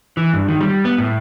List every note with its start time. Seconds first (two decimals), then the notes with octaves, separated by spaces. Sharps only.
0.17 E3
0.33 G2
0.48 D#3
0.61 G3
0.85 B3
0.98 A2